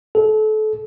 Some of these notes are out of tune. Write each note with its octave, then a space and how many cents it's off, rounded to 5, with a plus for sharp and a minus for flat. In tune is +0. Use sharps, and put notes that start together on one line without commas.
A4 -30